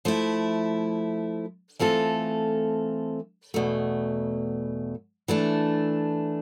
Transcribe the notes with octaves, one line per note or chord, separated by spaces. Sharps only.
F3 A3 E4
E3 A3 C4 F4 A4
E2 B2 A3
E3 A3 D4